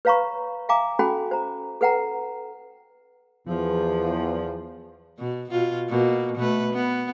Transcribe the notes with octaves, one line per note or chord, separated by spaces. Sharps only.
B4 C#5 F5 A#5 B5 C#6
E5 F5 G#5 A#5 D6 D#6
C#4 F#4 A4 G5 G#5 B5
C5 A#5
A4 B4 F#5 G5 A#5
E2 F3
B2
B2 F4
B2 A#3
B2 A3 B4
B3